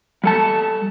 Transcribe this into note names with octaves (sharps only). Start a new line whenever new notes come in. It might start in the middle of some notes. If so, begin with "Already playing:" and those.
G3 A4 A5